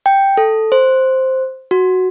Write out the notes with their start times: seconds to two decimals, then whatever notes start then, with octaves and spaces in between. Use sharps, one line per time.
0.06 G5
0.37 A4
0.72 C5
1.71 F#4